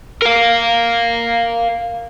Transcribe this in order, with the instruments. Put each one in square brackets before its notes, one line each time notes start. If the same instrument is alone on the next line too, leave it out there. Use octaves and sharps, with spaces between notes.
[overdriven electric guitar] A#4 F5